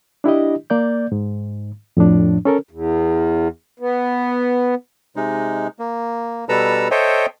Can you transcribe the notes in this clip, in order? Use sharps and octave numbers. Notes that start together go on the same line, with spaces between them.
D4 E4 G4 D#5
A#3 D5 G6
G#2
F2 A2 F3 D4
C#4 A4 A#4
E2
B3
C3 G#3 D#4
A#3
B2 G3 A4 B4 A#5 E6
A4 C5 C#5 D#5 E5 G5